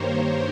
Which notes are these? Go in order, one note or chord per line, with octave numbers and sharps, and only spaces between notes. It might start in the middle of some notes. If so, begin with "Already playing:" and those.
Already playing: G2 D#3 G3 A#3 A#4 C5 C#5